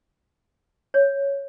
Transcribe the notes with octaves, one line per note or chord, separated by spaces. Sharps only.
C#5